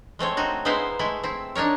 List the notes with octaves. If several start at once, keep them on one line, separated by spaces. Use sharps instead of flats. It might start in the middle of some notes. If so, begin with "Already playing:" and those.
G#3 A3 C4 C#5
D#4 F#4
G#3 B3 D#4 E4 C5 F5
G#3 A3 E4
C4 E4
D4 D#4 A#4 C#5